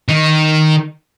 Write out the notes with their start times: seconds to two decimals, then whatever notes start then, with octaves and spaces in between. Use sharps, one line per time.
0.09 D#3